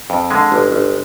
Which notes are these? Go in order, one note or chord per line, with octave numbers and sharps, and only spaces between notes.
F2
D3 G#3
G1
G1